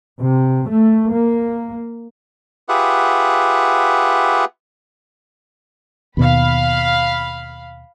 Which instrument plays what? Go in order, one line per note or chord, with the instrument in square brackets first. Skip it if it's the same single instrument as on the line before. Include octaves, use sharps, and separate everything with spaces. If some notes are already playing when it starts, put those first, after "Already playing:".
[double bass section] C3
A3
A#3
[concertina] F4 G4 G#4 B4 E5 F#5
[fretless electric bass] D#2 B2 [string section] F5 B5